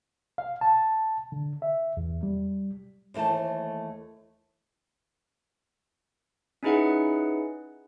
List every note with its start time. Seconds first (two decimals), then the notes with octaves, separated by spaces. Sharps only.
0.38 F5
0.61 A5
1.32 D3
1.62 E5
1.97 E2
2.23 G3
3.14 D#2 E3 A3 C5 A5
6.63 C#4 D#4 E4 G#4 B4 F#5